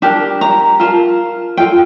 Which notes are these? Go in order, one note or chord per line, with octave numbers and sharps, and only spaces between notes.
D4 G4 A#4 A5
A#5
F4 A#4 A5
F4 A4 G5